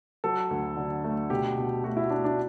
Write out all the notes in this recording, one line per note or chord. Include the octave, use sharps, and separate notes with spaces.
F#3 A4
D2
D3
A3
B2 G4
B2
A3 F#4
E4
A3 D4
D4